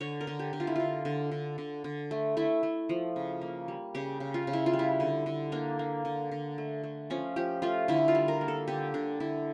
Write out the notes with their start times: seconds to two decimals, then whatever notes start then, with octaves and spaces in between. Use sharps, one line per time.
0.01 D3 C#5
0.21 A#4
0.27 D3
0.39 G4
0.53 D3
0.60 F4
0.67 E4
0.76 D3 F4
1.05 D3
1.32 D3
1.58 D3
1.84 D3
2.11 A3
2.37 A3 E4
2.63 A3
2.89 F3
3.16 C#3
3.42 A#3
3.68 G3
3.95 C#3 G4
4.20 C#3
4.34 F4
4.47 C#3
4.53 E4
4.66 F4
4.73 G3
4.79 E4
5.00 D3
5.26 D3
5.52 A#3 D4
5.79 A#3
6.05 D3
6.32 D3
6.58 A3
6.84 A3
7.10 F3 C#4
7.36 F3 G4
7.62 A3 F4
7.88 D3 E4
8.08 F4
8.15 G3
8.28 A#4
8.41 A#3
8.48 A4
8.68 D3 G4
8.94 D3 D4
9.20 D3 E4